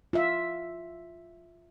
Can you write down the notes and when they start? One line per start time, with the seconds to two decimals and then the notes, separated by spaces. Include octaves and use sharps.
0.13 F4 E5